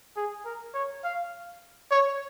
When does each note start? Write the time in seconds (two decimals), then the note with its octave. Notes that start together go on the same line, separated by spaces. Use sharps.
0.16 G#4
0.46 A#4
0.74 C#5
1.04 F5
1.91 C#5